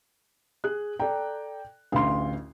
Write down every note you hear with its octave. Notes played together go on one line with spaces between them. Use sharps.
G#4 F#6
A4 D5 G5 A#5
A1 D2 F5 C6